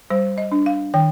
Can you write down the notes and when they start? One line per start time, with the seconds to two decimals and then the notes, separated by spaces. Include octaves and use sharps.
0.10 G3 C5
0.38 D#5
0.52 D4
0.66 F5
0.94 D#3 G5